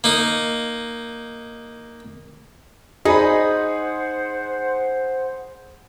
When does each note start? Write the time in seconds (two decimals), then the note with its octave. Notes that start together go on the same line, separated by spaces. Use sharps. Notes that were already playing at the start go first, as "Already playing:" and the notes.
0.04 A#3 D#4
3.05 D#4 G#4 C5 F#5 B5